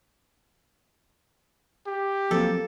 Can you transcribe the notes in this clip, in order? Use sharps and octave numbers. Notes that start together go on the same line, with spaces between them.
G4
F3 F#3 A#3 C4 A4